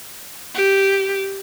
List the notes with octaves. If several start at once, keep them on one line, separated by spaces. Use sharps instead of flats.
G4